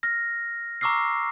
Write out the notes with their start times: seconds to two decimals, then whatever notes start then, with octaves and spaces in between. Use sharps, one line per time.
0.03 F6 A#6
0.81 A#5 C#6 D6 E6 F6 C7